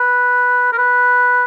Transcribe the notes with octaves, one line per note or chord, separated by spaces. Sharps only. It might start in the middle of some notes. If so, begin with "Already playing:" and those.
Already playing: B4
A#4
B4